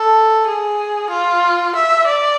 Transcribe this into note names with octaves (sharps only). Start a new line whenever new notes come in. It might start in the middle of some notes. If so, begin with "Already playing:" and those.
Already playing: A4
G#4
F4
E5
D5